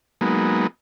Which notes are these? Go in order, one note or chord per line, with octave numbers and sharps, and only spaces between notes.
F#3 G#3 A#3 B3 D#4